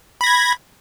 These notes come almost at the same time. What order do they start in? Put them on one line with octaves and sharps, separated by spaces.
B5 A#6 G#6